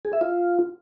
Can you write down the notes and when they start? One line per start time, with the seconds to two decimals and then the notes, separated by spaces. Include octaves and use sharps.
0.05 G#4
0.13 E5
0.21 F4